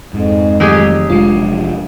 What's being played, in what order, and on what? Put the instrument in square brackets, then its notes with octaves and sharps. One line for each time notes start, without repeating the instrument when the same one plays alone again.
[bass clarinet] F2 [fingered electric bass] G#2
[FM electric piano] D#3 F3 A3 [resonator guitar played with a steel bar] F#3 G4 G#4
[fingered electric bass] F1 F3 D4 [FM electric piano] G#3 F4